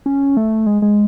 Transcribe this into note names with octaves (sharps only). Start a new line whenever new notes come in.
C#4
A3
G#3
G#3